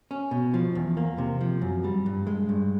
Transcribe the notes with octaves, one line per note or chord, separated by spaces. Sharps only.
C#4
B2
F3
E2
A#3
C3
F3
F#2
G3
G2
G#3
G2